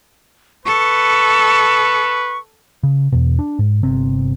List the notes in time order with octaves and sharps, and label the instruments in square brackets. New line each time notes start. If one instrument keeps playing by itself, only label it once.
[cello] A4 [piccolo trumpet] B4 [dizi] C#6
[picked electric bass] C#3
E2 B2
D4
G#2
G1 C3 C4